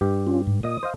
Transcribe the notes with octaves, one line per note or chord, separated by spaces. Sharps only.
G2 G4
C#4 F4
G#2
A#2 D#5 D#6
C5 D#5 F5